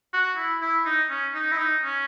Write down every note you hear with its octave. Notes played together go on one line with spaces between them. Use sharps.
F#4
E4
E4
D#4
C#4
D#4
E4
D#4
C#4